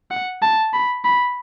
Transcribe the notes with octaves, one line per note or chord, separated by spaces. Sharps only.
F#5
A5
B5
B5